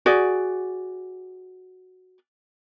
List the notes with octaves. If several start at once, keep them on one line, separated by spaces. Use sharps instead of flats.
F#4 G#4 D5